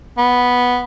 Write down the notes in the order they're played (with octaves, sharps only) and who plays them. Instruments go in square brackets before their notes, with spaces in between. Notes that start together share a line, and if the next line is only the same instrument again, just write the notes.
[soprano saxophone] B3